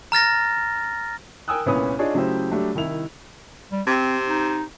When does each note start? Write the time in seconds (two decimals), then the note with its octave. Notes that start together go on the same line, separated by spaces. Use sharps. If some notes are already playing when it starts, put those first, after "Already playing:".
0.12 A#5 F6 A6 A#6
1.48 A#4 G5 G#5 D#6 E6 F#6
1.66 C2 A#2 B3 C#4 B4 D#6
1.99 D4 D#4 F4 G#4 C#5 D5
2.14 C#3 F#3 A3 E4 G4 C5
2.51 F#3 G3 A3 D4 G4
2.75 C2 D#3 E4 F7
3.72 G3
3.87 C3 C4
4.27 D#4